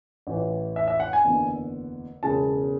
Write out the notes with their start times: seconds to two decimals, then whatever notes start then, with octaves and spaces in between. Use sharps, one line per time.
0.27 A1 A2 E3
0.76 E5
0.88 E5
1.00 F#5
1.13 G#5
1.25 F#1 E2 D3
2.23 E1 E2 C#3 G#3 A5